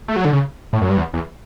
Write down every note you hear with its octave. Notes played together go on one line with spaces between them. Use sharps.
A3
F#3
D3
C#3
A2
F#2
G2
E2
E2